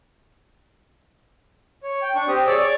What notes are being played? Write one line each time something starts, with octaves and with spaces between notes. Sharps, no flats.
C#5
G5
D4 C#6
C4 G4 D#6
G#4 C#5 D5 G#5 D6 E6
C#5 D5 C#6 D6